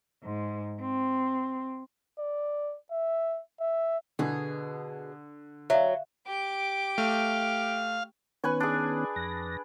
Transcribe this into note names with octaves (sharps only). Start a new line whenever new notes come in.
G#2
C4
D5
E5
E5
B2 D3 G#4
F#3 E5 F5
G4 D6
A3 F5
D#3 B3 C#4 B4 G#5 C#6
D4 G#4
F2 A#6